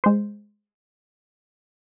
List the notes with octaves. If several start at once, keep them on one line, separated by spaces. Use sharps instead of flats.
G#3 C5